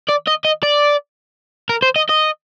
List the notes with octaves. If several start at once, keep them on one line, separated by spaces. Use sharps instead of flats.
D5
D#5
D#5
D5
A#4
C5
D#5
D#5